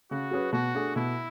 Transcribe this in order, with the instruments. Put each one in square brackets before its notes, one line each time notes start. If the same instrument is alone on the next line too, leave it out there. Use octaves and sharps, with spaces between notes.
[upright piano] C#3 [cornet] F#4
[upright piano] F#3 C#4 G#4 B4
[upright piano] B2 [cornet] F#4
[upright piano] A3 D4 G#4
[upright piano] B2 [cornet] E4